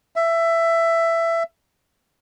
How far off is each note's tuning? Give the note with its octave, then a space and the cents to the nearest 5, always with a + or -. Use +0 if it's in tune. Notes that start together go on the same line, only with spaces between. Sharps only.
E5 +15